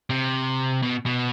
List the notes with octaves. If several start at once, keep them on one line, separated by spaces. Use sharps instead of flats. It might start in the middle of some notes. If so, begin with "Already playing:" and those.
C3
B2
B2